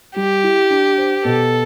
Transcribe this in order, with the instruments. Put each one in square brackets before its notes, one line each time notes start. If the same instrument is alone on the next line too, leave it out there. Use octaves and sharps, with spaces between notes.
[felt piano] G3 [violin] G4
[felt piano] E4
D4
C5
[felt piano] B2 [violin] A4